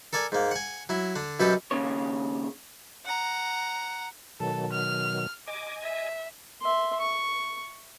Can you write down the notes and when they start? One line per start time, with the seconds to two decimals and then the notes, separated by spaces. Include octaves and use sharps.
0.13 A4 A#4 D5 G#5
0.32 G#2 A#3
0.51 F#5 G#5
0.89 F#3 E4
1.16 D3 D4
1.40 F#2 B2 F#3 B3 G4 A4
1.71 D#2 C#3 C#5
3.05 F#5 A#5
4.40 B2 D#3 F#3 A4
4.72 F6
5.48 D#5 G#5 D6
5.83 E5
6.62 E5 C6
7.00 C#6